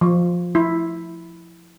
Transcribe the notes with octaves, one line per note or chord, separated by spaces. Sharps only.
F3
E4